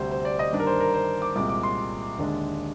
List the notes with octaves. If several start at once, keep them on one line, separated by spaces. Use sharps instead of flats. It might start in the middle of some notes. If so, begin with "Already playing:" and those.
Already playing: D2 C3 G3 C4 C5
C5
D5
D#5
G2 D#3 G3 A#3 D4
A#4
C5
A#4
C5
D6
C2 A#2 G#3 C4 D6
D6
C6
D#2 D3 G#3 D4